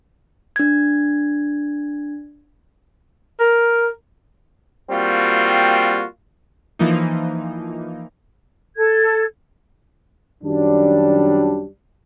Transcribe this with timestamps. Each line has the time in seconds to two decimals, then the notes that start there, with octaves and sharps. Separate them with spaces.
0.56 D4 G#6
3.40 A#4
4.91 G3 A#3 C4 F4 F#4
6.79 E3 F3 A#3 D#4
8.77 A4 G#6
10.44 F#2 D#3 F#3 G3 D4